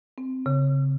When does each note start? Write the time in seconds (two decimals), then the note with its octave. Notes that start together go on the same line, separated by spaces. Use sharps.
0.18 C4
0.46 C#3